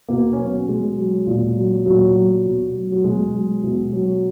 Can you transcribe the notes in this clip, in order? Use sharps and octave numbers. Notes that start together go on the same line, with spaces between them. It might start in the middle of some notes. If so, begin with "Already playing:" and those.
B2 A#3
C#4
F#3 B3
B2 G#3
F#3
A#2
F#3
A#2 F#3
F#3
B2
F#3
F#3
B2 G#3
F#3
B2
F#3